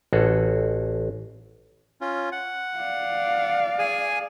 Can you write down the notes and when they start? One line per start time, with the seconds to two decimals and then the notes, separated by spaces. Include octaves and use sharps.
0.13 A1 F#4 G#4 A4
2.01 C#4 F4
2.32 F#5
2.77 D5 F5
3.79 G#4 G#5